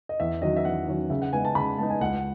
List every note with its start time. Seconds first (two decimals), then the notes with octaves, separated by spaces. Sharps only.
0.09 D#5
0.20 E2 E5
0.42 D#3 F#3 C#4 D#5
0.57 E5
0.65 E2 F#5
0.87 D#3 F#3 C#4
1.10 C#3 E5
1.22 F#5
1.32 G#3 B3 D#4 G#5
1.45 A5
1.55 C#3 B5
1.78 G#3 B3 D#4 A5
1.90 G#5
2.01 C#2 F#5